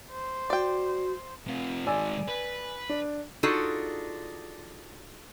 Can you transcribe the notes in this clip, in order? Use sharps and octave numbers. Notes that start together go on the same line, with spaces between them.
C5
F#4 D5 G5
C3 F4
D#3 G#3 D5 G#5 E6
B4
D4
D4 D#4 F4 F#4 G#4 A4